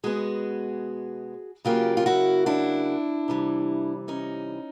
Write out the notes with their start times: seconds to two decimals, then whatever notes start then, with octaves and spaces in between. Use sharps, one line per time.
0.03 B2 G#3 B3 F#4 G#4
1.65 C#3 F#3 A#3 F4 G4
1.97 F4
2.06 E4 F#4
2.46 D4 E4
3.28 C3 E3 G3
4.08 C#4 D#4